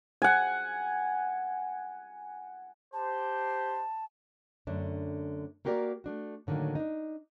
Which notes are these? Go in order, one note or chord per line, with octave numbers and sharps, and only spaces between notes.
F#5 G#5
G4 C5 A5
F#2 D3 A3 D4
A#3 F#4 G4 A#4 C5 D5
A3 D4 F#4
A2 D3 D#3 F#3 A#3
D4 D#4